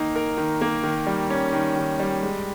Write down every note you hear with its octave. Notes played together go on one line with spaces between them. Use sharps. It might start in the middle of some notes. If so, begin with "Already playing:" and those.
Already playing: D#3 A#3 D#4
A#4
D#3
A#3
D#3
G3
C#4
D#3
D#3
G3
G#3